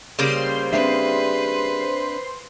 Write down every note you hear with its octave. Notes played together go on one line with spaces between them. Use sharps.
C#3 G3 A#3 C5 C6
C4 D4 B4 E5